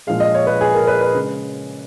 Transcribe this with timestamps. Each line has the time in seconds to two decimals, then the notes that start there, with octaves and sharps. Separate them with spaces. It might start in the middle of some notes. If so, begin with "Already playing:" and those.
0.07 A#2 F3 G#3 F5
0.20 D#5
0.34 C#5
0.47 B4
0.61 G#4
0.74 A#4
0.87 B4
1.01 B4
1.15 C#3 G#3